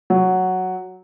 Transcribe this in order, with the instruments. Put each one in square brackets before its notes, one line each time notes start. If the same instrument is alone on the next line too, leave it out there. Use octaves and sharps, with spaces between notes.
[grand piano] F#3